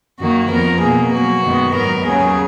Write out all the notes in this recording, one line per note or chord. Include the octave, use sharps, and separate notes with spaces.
F#2 D#3 A#3 F#4
F2 F3 B3 A#4
B2 A#3 G#4
B2 F#3 A#3 F#4
F#2 D#3 G#3 B3
G#2 F#3 B3 A#4
D#2 C#3 F#3 G#4